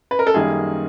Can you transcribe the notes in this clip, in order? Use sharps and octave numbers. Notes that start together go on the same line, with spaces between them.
B4
A#4
A4
F#2 D#3 G3 A#3 G#4